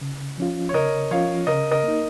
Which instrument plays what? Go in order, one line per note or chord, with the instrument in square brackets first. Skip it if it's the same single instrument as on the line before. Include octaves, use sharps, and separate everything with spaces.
[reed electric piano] C#3
F3 C#4 F4
[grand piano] C#5
[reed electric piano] C#3 [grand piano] A#4 D#5
[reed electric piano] F3 C#4 F4 [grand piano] C#5 F5
[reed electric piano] C#3 [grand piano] A#4 D#5
[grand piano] A#4 D#5
[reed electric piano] A#3 D#4